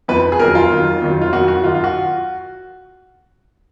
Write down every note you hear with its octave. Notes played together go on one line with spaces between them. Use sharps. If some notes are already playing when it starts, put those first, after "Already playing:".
F2 F3 B4
G#4
F2 D#3 F#3 A#4
F4
F2 D#3 F#3
F2 D#3 F#3
F4
F2 D#3 F#3 F#4
F#4
F#2 D#3 F#3 F4
F4
F#4